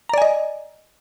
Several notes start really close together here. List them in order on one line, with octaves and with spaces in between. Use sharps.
A#5 D5 G#5 D#5